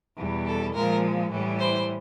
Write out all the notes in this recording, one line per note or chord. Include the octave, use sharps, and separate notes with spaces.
E2 B2 G3
A4
A#2 F3 G#3 A#4
A2 E3 G3
C5